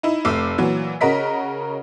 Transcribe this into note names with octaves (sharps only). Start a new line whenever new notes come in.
D#4 E4
F1 A3 A4 D6 E6 C7
A#2 E3 F#3
C#3 C#4 F#4 A#4 D#5 B6